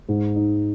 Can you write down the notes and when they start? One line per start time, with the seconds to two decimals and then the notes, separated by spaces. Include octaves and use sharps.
0.09 G#2
0.36 D#4